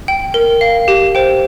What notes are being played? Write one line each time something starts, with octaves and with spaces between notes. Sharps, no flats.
G5
A#4
F5
G4
C5 G5